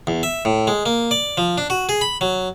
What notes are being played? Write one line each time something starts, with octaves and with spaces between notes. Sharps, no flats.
E2
E5
A2
G#3
A#3
D5
F3
D4
F#4
G#4
B5
F#3